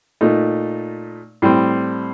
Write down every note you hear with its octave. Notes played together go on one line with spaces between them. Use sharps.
A#2 A3 D#4
A2 G3 C4